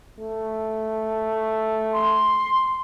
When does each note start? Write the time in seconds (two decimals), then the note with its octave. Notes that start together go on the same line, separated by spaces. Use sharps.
0.19 A3
1.93 C6